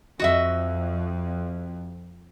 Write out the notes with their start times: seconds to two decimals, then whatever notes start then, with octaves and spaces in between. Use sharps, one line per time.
0.19 F2 F#4 D#5 E5